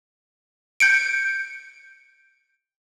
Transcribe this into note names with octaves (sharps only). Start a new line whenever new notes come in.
G6 C#7 D7